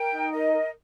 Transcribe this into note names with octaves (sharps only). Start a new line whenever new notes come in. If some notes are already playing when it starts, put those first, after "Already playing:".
Already playing: A#4 G5
D#4
A#4 D#5
A#4